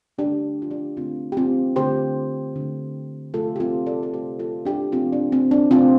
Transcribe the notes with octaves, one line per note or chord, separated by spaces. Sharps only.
D3 A3 D4 G4
F4
D4 G4
D3 A3 C4 F4
G4
C4 F4
D3 A3 G4 C5
D3 A3
C3 A3 F4 A4
G4
C4 F4
A4 D5
A4
C3 A3 G4 C5
F4 A4
D4 G4
C3 A3 C4 F4
D4
C4
D4
C3 A3 C4 F4